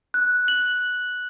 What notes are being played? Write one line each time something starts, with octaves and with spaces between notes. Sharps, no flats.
F#6
F#7